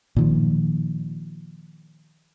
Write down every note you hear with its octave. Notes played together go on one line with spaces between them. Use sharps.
A#2 D#3 F3